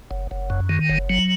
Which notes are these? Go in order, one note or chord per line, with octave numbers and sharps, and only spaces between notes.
F#1
F#1
F#2
D#3
F#1
F#3